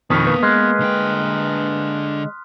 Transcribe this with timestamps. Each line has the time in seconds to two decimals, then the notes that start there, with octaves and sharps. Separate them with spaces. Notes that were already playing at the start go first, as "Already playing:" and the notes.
0.10 F2 B2 D#3 B3 A#4 G5 D#6 B6
0.27 A#3 B4
0.43 G#3 C6 F6 F#6
0.80 D3 G5